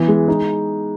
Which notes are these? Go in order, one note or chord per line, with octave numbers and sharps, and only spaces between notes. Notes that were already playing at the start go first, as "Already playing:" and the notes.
Already playing: E3 B3
G#3
D#4